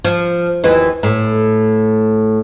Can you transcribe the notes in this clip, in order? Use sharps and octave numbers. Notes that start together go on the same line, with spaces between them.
F3
D#2 E3
A2